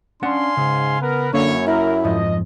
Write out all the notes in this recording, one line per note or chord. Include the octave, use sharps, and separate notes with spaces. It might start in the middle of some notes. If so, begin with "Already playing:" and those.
C#4 D4 F5 F#5 G#5 C6
G#2 C#3
B3 A#4 B4
F#2 D3 A#3 C#4 E4 C#5 F5
E4 A#4
F2 G#2 F3 D#5